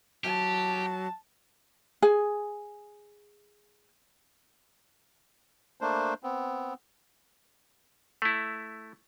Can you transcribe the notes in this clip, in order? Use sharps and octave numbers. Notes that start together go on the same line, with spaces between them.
F#3 G4 A5
G#4 G#5
A3 A#3 D4 C5
B3 C4
A3 E4